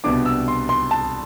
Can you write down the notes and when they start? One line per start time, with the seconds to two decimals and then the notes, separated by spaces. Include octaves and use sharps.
0.04 C2 B2 B3 D4 D6
0.25 E6
0.48 C6
0.69 C6
0.91 A5